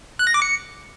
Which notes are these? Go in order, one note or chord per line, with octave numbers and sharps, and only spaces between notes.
F#6
A#6
D6
C#7